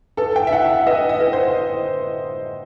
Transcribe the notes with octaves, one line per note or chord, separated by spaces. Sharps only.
A4 B4
G5
E5
E4 F#5
E5
B4 D#5
D#5
B4
C5